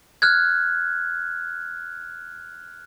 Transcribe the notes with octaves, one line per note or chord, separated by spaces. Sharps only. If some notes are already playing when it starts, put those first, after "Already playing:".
F6 F#6 G#6